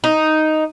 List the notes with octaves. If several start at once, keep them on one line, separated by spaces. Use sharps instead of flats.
D#4